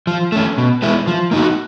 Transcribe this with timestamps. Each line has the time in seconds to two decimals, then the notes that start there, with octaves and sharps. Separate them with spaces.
0.07 F3
0.32 A3 C#4
0.58 B2
0.82 G#3 B3 E4
1.07 F3
1.31 A#3 D#4 F#4